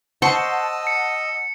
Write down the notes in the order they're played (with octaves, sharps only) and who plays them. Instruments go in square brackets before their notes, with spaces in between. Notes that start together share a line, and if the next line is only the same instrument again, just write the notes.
[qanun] C5 C#6 [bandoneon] D#5 E6 [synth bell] F#5 A5
[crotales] C#7